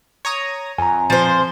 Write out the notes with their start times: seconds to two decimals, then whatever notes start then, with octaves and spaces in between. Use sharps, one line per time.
0.25 C#5 A#5 D#6
0.78 F2 G#5 A#5
1.10 F3 C5